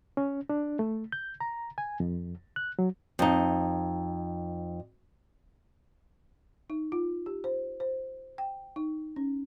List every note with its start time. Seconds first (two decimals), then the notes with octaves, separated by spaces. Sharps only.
0.17 C#4
0.50 D4
0.79 A3
1.12 G6
1.41 A#5
1.78 G#5
2.00 F2
2.56 F#6
2.79 F#3
3.19 F2 D#4
6.70 D#4
6.92 F4
7.26 G4
7.44 C5
7.80 C5
8.38 G5
8.76 D#4
9.16 C#4